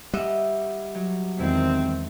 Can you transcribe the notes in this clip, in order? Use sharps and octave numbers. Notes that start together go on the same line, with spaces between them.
G3 D#5 E5 F#5
F#3
E2 G#2 D#3 C4 E4